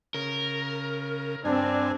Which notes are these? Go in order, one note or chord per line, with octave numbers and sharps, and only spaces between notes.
C#3 A#4
G2 C4 D4 G#5